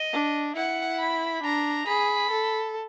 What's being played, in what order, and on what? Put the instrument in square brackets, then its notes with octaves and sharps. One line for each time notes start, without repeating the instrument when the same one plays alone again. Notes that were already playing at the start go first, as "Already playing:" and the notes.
Already playing: [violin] D#5
[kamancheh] D4
[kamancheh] E4 [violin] F#5
[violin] B5
[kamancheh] D4 [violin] A#5
[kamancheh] G#4 [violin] B5
[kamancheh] A4